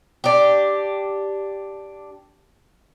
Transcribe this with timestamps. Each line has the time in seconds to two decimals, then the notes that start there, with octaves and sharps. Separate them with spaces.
0.24 D4 G4